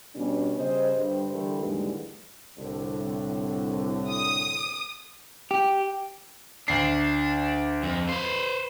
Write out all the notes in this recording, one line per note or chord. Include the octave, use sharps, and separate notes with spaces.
B2 G3 C#4 D4
C#3 G3 C5 D#5
G2 D3 G3 C5
D3 E3 G3 A3 A4 A#4
D#2 G#2 D3 E3 G3 G#3
C2 A2 D3
D#6
G4
D2 D4 C7
F2
B4 C5